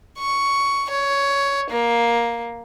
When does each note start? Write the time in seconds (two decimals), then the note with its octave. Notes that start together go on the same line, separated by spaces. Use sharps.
0.18 C#6
0.90 C#5
1.70 A#3